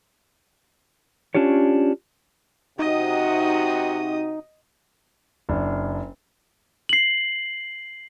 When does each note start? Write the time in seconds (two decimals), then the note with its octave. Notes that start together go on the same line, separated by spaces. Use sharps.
1.35 C#4 D4 F4 G4 C#5
2.79 C3 D#4 F#4 D#5 D#6
5.49 F#1 D4
6.89 C7 F#7